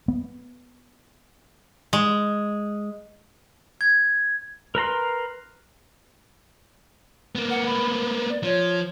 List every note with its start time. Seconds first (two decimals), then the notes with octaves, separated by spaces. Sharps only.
0.08 B3
1.93 G#3
3.81 G#6
4.75 A#4 B4 A#5 C6
7.35 A#3 B3
7.50 F#5
7.66 B5
8.29 D5
8.43 F3 C#5